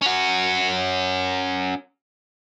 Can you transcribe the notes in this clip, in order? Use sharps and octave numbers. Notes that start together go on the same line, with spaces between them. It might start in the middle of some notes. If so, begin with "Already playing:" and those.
C#4 F#4